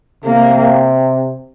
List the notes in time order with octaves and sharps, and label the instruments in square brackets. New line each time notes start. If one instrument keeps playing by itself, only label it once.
[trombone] C3 [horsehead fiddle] A#3